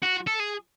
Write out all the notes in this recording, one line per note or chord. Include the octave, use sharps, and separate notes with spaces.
F#4
A4
G#4